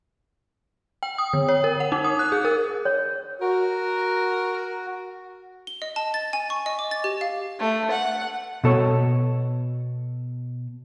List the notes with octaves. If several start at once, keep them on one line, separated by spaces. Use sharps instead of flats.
G5
D#6
D3
C#5
A#4
F#5
D#4
D#6
F#6
G#4
A#4
C#5
F#4 A#4
G7
D#5
A5
A6
G#5
C#6
D#5
D6
A6
G4
F5
A3
F#5
B2 A4 C#5